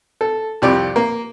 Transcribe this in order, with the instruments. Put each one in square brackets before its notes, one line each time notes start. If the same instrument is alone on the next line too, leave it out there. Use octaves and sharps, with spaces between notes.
[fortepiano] A4
C2 F2 G4 D5
A#3